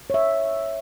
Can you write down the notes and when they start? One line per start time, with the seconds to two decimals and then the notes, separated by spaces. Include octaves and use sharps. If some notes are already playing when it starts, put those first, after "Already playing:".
0.10 C#5 E5